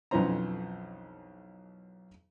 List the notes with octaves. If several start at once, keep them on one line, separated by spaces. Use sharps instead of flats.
B1 F2 E3 C#4 C5 A#5